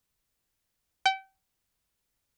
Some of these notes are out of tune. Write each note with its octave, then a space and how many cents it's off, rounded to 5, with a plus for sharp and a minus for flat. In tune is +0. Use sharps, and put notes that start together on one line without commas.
G5 -30